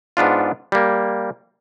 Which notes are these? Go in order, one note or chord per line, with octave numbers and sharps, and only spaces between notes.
G#2 B3 D4 F4
G3 A#3